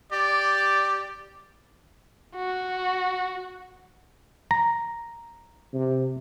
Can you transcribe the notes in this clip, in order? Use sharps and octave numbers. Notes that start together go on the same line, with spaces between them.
G4 D5
F#4
A#5
C3